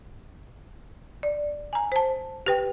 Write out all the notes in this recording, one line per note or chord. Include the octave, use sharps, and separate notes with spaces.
D5
G#5 A#5
C5 A5
G4 B4 G5